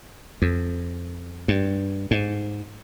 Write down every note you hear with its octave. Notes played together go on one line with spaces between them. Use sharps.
F2
G2
G#2